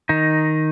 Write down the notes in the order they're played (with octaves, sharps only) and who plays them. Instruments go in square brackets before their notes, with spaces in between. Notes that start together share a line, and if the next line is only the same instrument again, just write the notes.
[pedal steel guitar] D#3 D#4